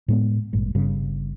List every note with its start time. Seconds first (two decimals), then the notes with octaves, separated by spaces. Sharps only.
0.08 A2 G#3 B3
0.53 G#1 G2 A#2
0.75 G1 G2 C#3